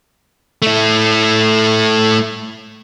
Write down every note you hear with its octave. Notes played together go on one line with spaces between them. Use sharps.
A3 E4